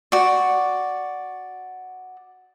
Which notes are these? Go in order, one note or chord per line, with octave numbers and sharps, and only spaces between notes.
F#4 D5